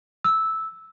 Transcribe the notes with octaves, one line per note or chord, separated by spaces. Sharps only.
E6